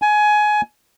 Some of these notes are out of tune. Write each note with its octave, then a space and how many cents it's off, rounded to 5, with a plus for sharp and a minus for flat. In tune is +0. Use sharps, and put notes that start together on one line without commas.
G#5 +20